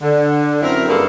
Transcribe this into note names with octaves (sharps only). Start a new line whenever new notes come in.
D3
F#2 C4 E4 A#4
G2 D3 A#3 G#4 A4